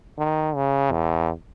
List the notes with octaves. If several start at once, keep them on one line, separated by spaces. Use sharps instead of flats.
D#3
C#3
E2